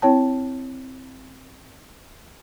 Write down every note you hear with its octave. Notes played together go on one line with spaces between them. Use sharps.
C4 E4 C#5 G5 A5